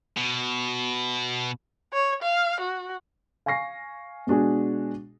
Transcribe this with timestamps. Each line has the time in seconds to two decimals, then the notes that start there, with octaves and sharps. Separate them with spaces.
0.17 B2
1.93 C#5
2.22 F5
2.60 F#4
3.46 F5 G#5 C#6 A#6 C7
4.27 B2 G#3 D4 F#4 G#4